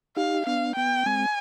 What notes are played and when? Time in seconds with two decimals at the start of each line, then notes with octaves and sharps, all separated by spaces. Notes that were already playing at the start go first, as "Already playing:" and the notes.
0.16 D#4 G4 F5
0.46 B3 D4 F5
0.76 B3 G5
1.06 G#3 C4 G#5